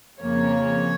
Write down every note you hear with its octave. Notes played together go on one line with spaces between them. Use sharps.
F2 C#3 F3 A#3 C#5